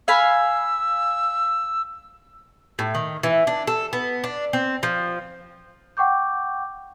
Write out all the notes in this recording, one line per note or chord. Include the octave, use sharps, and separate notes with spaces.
F5 G#5 B5 E6
A2
D#3
E3
D4
A4
B3
D4
C4
F3
F#5 G5 C#6 D6 G6